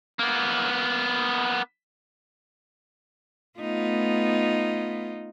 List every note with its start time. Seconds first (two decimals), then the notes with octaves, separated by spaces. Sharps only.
0.19 A#3 B3
3.59 A3 B3 D#4 F4